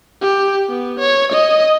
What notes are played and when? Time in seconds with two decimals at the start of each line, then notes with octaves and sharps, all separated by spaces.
0.22 G4
0.69 B3
1.00 C#5
1.32 D#5